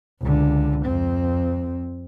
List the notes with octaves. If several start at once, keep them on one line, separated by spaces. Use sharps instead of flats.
C#2 D3
F2 C4